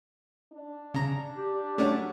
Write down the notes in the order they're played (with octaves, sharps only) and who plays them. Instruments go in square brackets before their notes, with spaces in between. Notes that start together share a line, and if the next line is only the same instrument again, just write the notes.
[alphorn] D4
[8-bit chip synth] C#3 A#5
[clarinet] G4
[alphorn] F#3 [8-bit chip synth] A3 C#4 D4